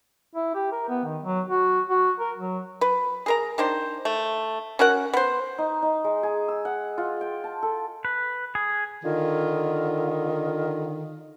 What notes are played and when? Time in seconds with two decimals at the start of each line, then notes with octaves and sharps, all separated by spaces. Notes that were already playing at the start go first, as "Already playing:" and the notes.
0.35 E4
0.54 G4
0.72 A#4
0.89 B3
1.05 D#3
1.23 F#3
1.49 F#4
1.90 F#4
2.20 A#4
2.38 F#3
2.81 B4
3.26 G#4 A#4 A#5
3.58 D#3 D4 C5
4.05 A3
4.79 C#4 F#4 A#4 F#5
5.13 B3 C5
5.58 D#4
5.82 D#4
6.04 G#3
6.23 G#4
6.48 E6
6.65 F#5
6.98 F4
7.21 G5
7.44 A5
7.63 A4
8.05 B4
8.55 G#4
9.04 D3 D#3 F4